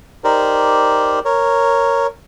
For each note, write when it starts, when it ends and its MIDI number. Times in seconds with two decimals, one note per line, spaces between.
0.24 1.19 63
0.24 1.19 67
0.24 1.19 70
0.24 1.19 72
0.24 1.19 74
1.25 2.07 70
1.25 2.07 73